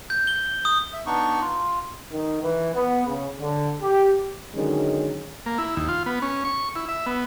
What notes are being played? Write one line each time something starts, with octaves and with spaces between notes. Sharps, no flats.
G6
G7
D#6
E5
B3 D4 D#4 C#6
F4
D#3
E3
B3
C#3
D3
G4
D3 D#3 F#3 G#3 C#4
A#3
E4
D#2
F4
B3
C#4
C#6
E4
E5
B3